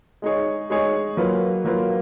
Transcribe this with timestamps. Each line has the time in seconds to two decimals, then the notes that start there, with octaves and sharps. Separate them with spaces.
0.22 G#3 D#4 G#4 C#5
0.70 G#3 D#4 G#4 C#5
1.17 F#3 A#3 F4 B4
1.65 F#3 A#3 F4 B4